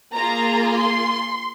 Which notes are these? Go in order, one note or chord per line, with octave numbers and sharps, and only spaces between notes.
A#3 F4 G#4 A#5
C6